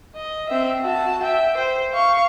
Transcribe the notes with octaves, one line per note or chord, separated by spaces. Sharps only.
D#5
C4 E5
F#4 A5
E5 G5
C5
F5 C#6